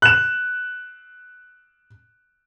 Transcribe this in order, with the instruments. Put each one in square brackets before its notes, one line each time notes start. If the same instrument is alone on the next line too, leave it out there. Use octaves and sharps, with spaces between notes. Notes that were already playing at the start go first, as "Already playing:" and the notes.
[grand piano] F#6 E7